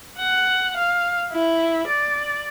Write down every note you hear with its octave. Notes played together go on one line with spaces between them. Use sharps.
F#5
F5
E4
D5